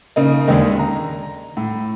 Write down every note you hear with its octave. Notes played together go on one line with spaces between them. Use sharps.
C#3 A#3 D#4
D#2 D3 D#3 G#3
A#5
A2